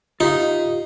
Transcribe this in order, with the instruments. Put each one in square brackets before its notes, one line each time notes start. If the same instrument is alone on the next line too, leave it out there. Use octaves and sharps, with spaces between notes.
[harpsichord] D#4 [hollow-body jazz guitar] F4 G4 F5